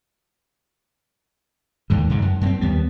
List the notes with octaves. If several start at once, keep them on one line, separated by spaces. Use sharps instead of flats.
D#2 G#2 D3
F2 G#2 G#3
F#2
F#2 A3 C4
D#2 G3 B3